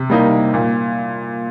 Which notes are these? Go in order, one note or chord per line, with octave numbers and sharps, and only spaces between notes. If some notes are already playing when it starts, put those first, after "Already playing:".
Already playing: C3
G3 A#3 D#4
A#2